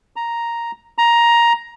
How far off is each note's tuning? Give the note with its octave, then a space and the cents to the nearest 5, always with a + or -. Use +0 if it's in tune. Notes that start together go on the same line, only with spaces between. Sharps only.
A#5 +0
A#5 +10